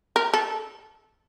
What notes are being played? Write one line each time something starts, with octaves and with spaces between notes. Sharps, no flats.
A#4
A4